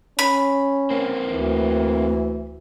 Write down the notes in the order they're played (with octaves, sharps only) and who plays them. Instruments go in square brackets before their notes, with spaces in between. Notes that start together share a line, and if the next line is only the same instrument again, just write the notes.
[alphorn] C#4 [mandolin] B5
[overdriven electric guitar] A#3 C4
[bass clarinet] D2 [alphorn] E3